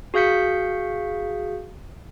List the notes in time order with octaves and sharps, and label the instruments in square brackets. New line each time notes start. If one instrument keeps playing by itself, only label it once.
[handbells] F#4 G#4 F5 G6 B6 C#7